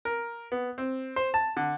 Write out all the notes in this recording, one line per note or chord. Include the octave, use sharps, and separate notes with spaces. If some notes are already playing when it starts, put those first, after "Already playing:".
A#4
B3
C4
C5
A5
D3